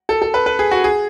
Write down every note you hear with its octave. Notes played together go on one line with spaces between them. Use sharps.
A4
A4
B4
B4
G#4
F#4
G#4